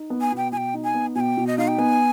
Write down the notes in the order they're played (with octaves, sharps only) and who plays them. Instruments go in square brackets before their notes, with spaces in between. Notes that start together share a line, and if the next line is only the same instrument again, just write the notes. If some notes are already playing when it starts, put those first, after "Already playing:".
Already playing: [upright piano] D#4
B3
[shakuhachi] G#5
[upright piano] B2 [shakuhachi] G5
[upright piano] B2 [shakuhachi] G#5
[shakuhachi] G5
[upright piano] D#4
[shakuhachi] G#5
[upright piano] B3
[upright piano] B2 [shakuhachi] G#5
[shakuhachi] G5
[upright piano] B2
[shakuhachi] D#5
[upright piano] D#4 [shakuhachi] F5
[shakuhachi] G5
[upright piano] B3 [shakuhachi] G#5